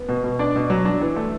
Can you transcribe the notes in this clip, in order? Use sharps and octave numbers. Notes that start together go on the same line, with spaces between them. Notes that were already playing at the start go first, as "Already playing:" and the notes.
Already playing: B3
B2
B2
D4 D5
B2
F#3
D4
E3
A3